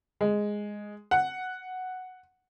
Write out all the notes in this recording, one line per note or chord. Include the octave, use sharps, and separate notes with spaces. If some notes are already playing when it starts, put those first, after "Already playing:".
G#3
F#5